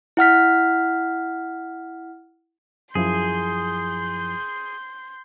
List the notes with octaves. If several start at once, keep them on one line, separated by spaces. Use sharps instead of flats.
E4 F#5 F6 B6
F#2 F3 E4 G#4 C6 G6